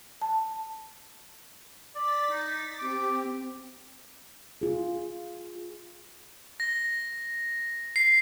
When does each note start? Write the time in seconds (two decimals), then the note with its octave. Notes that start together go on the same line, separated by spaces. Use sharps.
0.22 A5
1.95 D5 A6 B6
2.31 D#4
2.79 C4 G4 D6
4.61 F4 G#4
6.60 A#6
7.96 C7